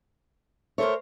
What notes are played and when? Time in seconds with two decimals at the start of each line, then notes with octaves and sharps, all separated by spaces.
0.78 A3 A#4 C5 C#5